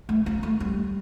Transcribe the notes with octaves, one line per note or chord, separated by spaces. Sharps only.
A3
A#3
A3
G3